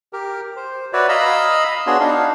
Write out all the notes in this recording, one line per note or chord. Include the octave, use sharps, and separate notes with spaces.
G4 A#4
C5
F#4 B4 C#5 D5 E5
D#5 F5 A#5 B5 E6
B3 D4 F#4 G#4 C#5 C6
D4 D#4 F5